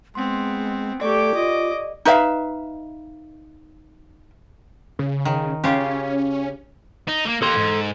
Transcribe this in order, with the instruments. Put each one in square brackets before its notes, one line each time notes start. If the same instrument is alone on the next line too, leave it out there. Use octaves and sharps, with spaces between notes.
[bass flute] G#3 [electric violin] B3 C4 [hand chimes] C6
[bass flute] A3 [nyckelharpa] G4 A4 [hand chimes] D5 C#6 [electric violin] D6
[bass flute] F4 [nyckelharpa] D#5
[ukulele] D#4 B4 E5 F5
[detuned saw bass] C#3
[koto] D#3
[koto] C#3 F4 G4 [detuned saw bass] C#4
[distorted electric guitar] D#4
A3 A#3
[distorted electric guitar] A#3 G4 [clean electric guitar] A4 C6
[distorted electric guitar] G#2